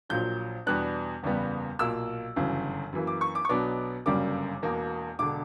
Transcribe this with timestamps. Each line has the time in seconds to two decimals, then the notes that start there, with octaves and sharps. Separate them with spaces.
0.09 A#1 A#2 F#3 G6
0.66 E2 B2 G3 B3 D4 F#6
1.23 F#1 E2 C#3 G3 B3
1.79 B1 A#2 A#3 E6
2.36 G1 F#2 C#3 E3
2.93 F#2 E3 A#3
3.07 D6
3.21 C#6
3.35 D6
3.45 C#6
3.49 B1 B2 F#3 B3 D4 D6
4.06 G1 F#2 C#3 G3 A#3 D6
4.63 E1 E2 B2 A#3
5.19 E1 D3 D6